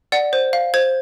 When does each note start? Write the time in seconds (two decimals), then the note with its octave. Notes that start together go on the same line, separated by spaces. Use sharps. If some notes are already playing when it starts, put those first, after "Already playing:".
0.12 D5 F#5
0.33 C5
0.53 F5
0.74 C5 G#6